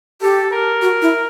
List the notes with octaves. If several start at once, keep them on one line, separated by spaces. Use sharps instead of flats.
G4 A4
A#4
F#4
E4